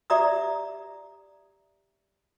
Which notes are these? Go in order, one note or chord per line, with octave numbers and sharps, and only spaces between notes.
G4 D5 E5 A#5 D6 D#6